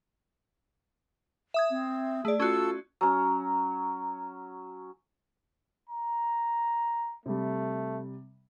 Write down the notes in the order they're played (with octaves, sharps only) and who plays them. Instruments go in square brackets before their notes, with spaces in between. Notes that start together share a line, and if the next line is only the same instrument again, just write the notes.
[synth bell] E5 D#6 G#6
[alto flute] C4
[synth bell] A3 D5 [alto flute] G#4
[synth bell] C#4 F#4 [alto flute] F4 [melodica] A4 E6
[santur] F#3 C#4
[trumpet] A#5
[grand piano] C3 G3 [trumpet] A3